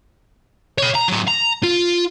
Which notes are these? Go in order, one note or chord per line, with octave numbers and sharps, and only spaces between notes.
C#5 B5
A#5
F#3 D4
A#5
F4